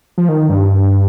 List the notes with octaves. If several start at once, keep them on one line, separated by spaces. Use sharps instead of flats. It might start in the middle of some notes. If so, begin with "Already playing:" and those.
F3
D#3
G2